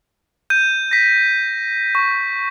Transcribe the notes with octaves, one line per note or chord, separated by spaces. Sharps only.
G6 D#7
A#6 B6
C#6